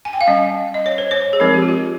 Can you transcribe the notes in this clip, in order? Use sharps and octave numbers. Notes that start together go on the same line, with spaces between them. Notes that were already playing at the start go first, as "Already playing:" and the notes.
G#5
G5
F5
G3 C#4 D#5
D#5
C#5
C5
C#5
G#4
F3 G#3 C4 D#4 A#4
G4
F4
G4